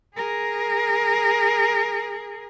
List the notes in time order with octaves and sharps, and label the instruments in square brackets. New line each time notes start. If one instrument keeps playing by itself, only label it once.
[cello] G#4 A#4